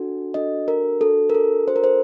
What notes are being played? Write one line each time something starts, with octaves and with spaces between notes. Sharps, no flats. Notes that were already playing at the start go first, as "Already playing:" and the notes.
Already playing: D4 F#4 A4
D4 F#4 A4 D#5
A#4
D4 F#4 A4
A#4
A4
D4 F#4 A4 C5
A#4
C5